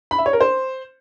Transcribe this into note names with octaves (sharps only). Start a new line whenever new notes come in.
B5
E5
C#5
A#4
C5